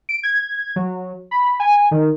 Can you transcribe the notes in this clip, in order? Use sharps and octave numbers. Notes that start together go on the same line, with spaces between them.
D7
G#6
F#3
B5
G#5
D#3